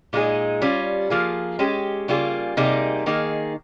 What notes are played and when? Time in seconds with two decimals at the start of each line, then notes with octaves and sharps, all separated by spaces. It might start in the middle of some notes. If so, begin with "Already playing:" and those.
0.13 A#2 G#3 D#4 G#4
0.62 G3 C#4 F4
1.10 F3 A#3 F4 G#4
1.59 G#3 C#4 G4
2.08 C#3 G3 A#3 F4 G#4
2.57 C3 G3 A#3 D#4 G#4
3.06 D#3 A#3 D#4 G#4